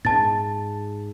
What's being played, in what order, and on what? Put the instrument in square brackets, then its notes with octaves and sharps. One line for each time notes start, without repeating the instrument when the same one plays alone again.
[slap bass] G#2 [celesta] A5 A6